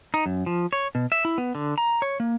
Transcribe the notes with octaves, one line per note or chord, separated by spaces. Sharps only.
D#4
F#2
F3
C#5
B2
E5
E4
B3
D3
A#5
C#5
A#3